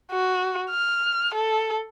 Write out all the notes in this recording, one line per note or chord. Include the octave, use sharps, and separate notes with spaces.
F#4
F6
A4